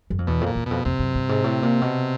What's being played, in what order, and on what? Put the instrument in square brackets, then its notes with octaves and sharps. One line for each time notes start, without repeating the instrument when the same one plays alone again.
[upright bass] F#2
F2
[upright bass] E2 [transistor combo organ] B2
[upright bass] F2
[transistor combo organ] A#2
[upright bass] E2
[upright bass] F2 [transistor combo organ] B2
[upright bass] F2 [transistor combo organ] C3
[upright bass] F#2
G2
G#2
A2
A#2
B2